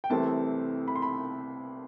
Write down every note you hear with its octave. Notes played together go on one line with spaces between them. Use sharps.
G5
C2 C3 E3 A3 C4 A5
B5
C6
B5